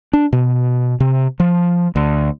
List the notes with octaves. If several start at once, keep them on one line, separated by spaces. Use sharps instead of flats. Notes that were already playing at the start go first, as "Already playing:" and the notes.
D4
B2
C3
F3
D2